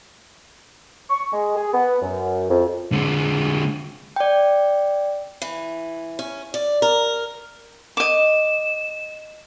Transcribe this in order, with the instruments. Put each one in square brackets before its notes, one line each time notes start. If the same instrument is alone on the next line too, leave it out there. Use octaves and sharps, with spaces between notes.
[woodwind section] C#6
G#3
G#4
B3
F#2
F2
[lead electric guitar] D3 G#3
[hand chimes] D5 G5
[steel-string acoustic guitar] E3
C#4
D5
A#4
[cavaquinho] D#5 D6 [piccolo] E7